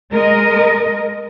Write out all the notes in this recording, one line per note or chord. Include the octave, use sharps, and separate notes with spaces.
G#3 A#4 D#5